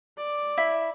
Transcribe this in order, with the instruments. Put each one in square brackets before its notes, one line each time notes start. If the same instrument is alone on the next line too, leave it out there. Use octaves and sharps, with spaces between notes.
[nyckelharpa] D5
[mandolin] E4